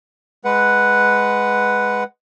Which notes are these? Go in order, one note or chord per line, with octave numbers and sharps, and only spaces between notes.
G#3 B4 F#5